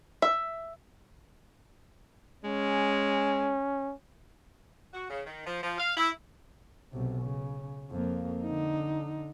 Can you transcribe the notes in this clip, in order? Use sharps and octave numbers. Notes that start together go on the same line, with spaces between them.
E5
G#3 C#4
F#4
C#3
D#3
F3
F3
F5
E4
B1 C3
C#3
F2 A#3
D3 D#4